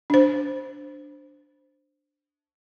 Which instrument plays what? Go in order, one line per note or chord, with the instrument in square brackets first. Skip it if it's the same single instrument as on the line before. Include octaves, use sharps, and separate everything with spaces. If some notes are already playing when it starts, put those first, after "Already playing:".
[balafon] D4 C5